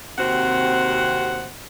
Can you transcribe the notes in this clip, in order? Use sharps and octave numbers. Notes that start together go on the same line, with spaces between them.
D#2 C3 C4 F#4 F#5